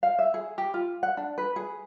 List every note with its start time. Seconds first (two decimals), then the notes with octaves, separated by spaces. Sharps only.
0.03 F5
0.19 E5
0.34 G#4
0.58 G4
0.74 F4
1.03 F#5
1.17 D4
1.38 B4
1.56 G#4